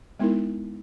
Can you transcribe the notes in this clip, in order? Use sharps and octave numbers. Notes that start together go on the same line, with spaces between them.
G#3 B3 D#4 E4 A#4